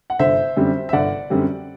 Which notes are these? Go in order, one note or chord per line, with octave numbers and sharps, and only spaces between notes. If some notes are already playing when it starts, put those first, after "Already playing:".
F#5
G1 C5 E5
F#2 D3 G3 C4
E5
G1 D5 F#5
F#2 D3 G3 C4